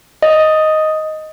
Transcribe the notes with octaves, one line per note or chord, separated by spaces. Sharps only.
D#5